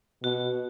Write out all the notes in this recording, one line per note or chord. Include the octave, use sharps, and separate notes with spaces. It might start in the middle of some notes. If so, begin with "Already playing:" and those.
B2 F#4